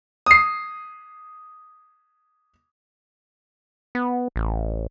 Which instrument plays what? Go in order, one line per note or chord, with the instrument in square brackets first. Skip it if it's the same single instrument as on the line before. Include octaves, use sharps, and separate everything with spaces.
[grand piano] D#6 C7
[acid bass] B3
A1